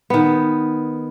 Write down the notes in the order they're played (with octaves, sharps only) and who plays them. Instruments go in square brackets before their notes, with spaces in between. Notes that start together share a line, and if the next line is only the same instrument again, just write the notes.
[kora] D#3 B3